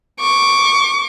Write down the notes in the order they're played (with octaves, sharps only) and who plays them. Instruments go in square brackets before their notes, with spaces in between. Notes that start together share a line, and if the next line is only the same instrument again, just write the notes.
[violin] C#6 D6